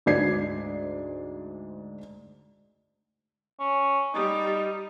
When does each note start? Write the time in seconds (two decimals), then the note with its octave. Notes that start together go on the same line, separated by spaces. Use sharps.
0.06 D2 G#2 D5 G#6 C7
3.60 C#4
4.14 G3 D#4 G4